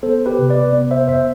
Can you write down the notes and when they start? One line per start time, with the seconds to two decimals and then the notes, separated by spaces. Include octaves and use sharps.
0.03 B3 A4 C5
0.26 G4 B4
0.39 C3
0.49 B4 D5
0.73 B3
0.91 C5 E5
1.08 F2 C5 E5